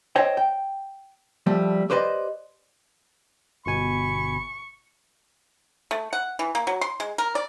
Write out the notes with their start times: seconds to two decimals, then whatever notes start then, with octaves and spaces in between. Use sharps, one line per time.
0.16 C5 C#5 D#5 G5
0.37 G5
1.46 F3 G3 A3
1.90 G4 B4 C5 D5 D#5
3.66 G1 B2 G#5 B5 C#6
5.91 A3
6.13 F#5
6.39 E3
6.55 A#3
6.67 F#3
6.81 C6
7.00 G#3
7.18 A#4
7.35 D5